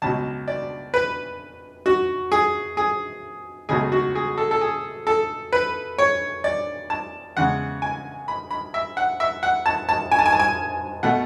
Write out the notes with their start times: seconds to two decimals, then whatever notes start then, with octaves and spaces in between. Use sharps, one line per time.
0.02 C#2 B2 F#3 A5
0.48 D5
0.94 B4
1.86 F#4
2.32 G#4
2.77 G#4
3.69 C#2 B2 F#3 A3 G#4
3.92 F#4
4.15 G#4
4.38 A4
4.51 A4
4.61 G#4
5.07 A4
5.53 B4
5.98 C#5
6.44 D5
6.90 A5
7.37 E2 C#3 G#3 F#5
7.82 G#5
8.28 B5
8.51 B5
8.74 E5
8.97 F#5
9.20 E5
9.43 F#5
9.66 A5
9.89 A5
10.12 G#5
10.19 A5
10.26 G#5
10.32 A5
10.39 G#5
11.03 B2 A3 F#5